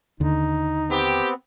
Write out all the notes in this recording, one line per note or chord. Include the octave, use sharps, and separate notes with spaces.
D#2 D3 D#4
B3 C4 G4